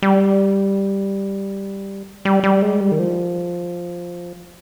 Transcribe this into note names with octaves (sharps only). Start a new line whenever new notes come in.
G3
G3
G3
G#3
G3
D#3
F3